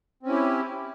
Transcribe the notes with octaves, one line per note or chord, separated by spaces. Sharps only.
C4 C#4 E4 G4